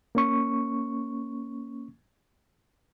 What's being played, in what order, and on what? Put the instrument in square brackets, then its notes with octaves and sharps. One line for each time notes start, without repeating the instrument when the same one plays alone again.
[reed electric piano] A#3 C#4 C#6